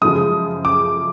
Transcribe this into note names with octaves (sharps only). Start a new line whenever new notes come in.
F#2 C#3 F3 G#3 D#6
D6